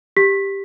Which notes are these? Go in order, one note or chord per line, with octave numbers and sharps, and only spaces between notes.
G4 B6